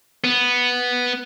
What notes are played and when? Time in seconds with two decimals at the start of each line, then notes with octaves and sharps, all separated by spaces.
0.24 B3